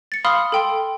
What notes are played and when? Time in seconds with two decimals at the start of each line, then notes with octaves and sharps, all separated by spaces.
0.12 A6 C#7
0.25 F5 B5 C6 D#6 F6
0.52 A4 G5 C6